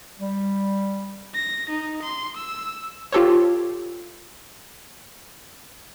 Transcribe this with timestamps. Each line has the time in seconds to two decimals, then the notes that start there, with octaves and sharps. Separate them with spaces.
0.19 G3
1.35 A#6
1.70 D#4
2.03 C6
2.37 E6
3.12 F4 G4 A4 C5 C#5